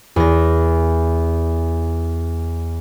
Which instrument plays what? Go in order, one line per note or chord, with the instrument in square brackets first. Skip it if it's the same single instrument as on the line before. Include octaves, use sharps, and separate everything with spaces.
[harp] E2 A#6